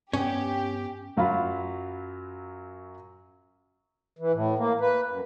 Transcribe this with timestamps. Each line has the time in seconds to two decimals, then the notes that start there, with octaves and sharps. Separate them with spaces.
0.13 G2 B3 C#4 G4
1.17 F#2 F#3 F4 F5 B5
4.19 E3
4.33 A2
4.58 A#3
4.81 B4
5.07 F#2